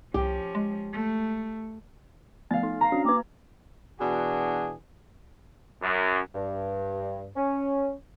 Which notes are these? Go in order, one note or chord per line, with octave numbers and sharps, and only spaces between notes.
C2 F3 C#4 G4
G#3
A3
F3 A3 B3 F5 A6
D#4
F5 A#5
C#4 D4 F#4
A#3 B4 D6
B2 E3 D4 F#4 G#4
F#2
G2
C#4